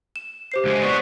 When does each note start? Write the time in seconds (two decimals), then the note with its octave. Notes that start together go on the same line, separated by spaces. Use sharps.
0.16 E7
0.52 G4 C5 C7
0.65 D2 G#3
0.82 B3 F#4 D5